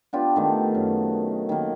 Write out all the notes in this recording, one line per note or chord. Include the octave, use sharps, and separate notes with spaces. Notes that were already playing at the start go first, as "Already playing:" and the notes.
B3 D4 F4 G4
D#3 A3
F#2
D#3 A#3